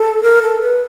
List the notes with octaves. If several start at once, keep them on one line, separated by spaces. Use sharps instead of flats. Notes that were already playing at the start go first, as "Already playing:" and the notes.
Already playing: A4
A#4
A4
B4